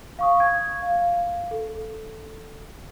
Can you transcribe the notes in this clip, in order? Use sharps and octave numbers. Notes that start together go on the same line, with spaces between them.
F5 C#6 D#6
G#6
F5
A4